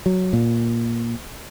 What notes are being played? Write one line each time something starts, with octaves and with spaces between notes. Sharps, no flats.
F#3
A#2